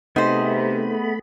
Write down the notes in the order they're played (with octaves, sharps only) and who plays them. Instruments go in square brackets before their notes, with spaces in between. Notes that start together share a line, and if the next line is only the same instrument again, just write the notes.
[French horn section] C3 [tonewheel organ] A3 B5 [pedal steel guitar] B3 G#4 D#5 [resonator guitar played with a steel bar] D#4 C5